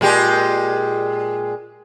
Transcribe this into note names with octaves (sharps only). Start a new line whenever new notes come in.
A#2 G#3 G4